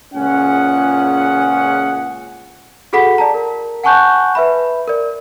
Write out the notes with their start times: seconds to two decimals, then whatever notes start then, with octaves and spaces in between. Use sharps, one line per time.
0.14 C#2 A#2 C#4 G#4 F#5
2.93 F#4 G#4 A4 F#5 B5 B6
3.18 D5 A5 A#5
3.34 A#4
3.84 F#5 G#5 A5 C#6 F#6 G6
4.35 B4 E5 B5
4.88 A#4 D5